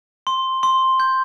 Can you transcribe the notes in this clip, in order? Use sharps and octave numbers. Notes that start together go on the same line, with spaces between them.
C6
C6
G6